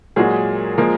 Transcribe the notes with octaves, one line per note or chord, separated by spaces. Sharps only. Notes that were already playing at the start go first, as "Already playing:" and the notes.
A#2 F#3 G#3 G#4
F3 G#3 A#3 A#4